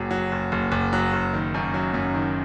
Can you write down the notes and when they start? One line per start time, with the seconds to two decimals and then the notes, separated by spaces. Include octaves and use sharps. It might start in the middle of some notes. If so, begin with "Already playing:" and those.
Already playing: F#1 F#3
0.11 F#3
0.32 F#1
0.52 F#1
0.72 F#1
0.93 F#3
1.13 F#1
1.33 D#3
1.54 F#2
1.74 F#3
1.94 F#2
2.14 D#3